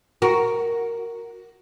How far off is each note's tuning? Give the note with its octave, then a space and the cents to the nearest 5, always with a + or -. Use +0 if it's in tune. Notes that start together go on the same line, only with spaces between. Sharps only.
F#4 +0 A#4 +0